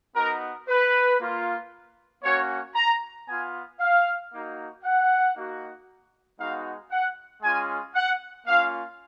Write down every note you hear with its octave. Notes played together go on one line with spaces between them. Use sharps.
B3 D#4 F#4 A#4
B4
A#3 F4
A#3 C#4 F#4 C#5
A#5
B3 F4 G#5
F5
A#3 D#4 F#4
F#5
A#3 D#4 F#4
G#3 B3 D#4 F#4 F5
F#5
G#3 C#4 F4 G#5
F#5
A#3 C#4 F4 F5